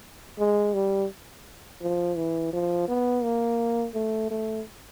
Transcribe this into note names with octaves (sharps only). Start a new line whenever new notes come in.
G#3
G3
F3
E3
F3
B3
A#3
A3
A3